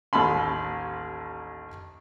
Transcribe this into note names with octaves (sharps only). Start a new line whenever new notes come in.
A1 D#2 A5 B5 C6